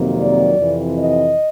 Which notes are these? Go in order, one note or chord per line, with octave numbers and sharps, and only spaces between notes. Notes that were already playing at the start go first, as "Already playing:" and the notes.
Already playing: F2 C3 D#3 F#3 A#3
D5
F2 C3 E3
D#5